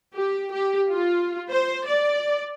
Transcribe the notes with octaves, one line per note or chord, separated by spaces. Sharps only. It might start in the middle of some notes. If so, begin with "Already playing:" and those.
G4
G4
F4
C5
D5